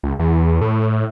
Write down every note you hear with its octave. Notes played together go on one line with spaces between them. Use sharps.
C#2
E2
A2